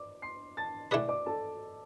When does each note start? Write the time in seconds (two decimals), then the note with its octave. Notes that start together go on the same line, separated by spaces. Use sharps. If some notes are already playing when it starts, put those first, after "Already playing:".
Already playing: D5 D6
0.22 C6 C7
0.57 A5 A6
0.91 D3 A3 E4 G#4 B4 D5 D6
1.08 D5 D6
1.26 A4 A5